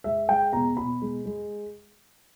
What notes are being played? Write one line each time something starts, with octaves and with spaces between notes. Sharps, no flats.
G#3 E5
G#3 G5
B2 A#5
B2 B5
G#3
G#3